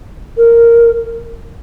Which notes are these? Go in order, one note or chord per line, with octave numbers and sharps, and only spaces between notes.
A#4